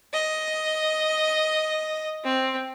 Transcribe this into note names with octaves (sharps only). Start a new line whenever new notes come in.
D#5
C4